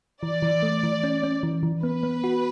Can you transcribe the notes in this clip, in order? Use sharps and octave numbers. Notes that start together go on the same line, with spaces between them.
E3 D5
E3
A3
E3
C#4
C#4
E3
E3
B3 B4
B3
F#4